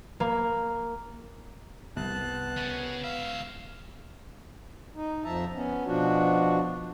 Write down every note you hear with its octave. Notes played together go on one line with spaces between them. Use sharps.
A#3
C2 B3 A5 F#6
C#3 C#4
C#2 E5 F5
D#4
F2 F3 E5 A5 A#5
B3 C#4
B2 F3 D4 F#4